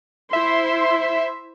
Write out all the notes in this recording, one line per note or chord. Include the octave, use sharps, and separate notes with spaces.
E4 C5 E5 C6